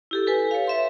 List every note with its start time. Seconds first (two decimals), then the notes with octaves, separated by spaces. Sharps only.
0.11 E4 G4 A4
0.27 A4 B4 G#5
0.51 C#5 F5
0.68 B4 E5 C6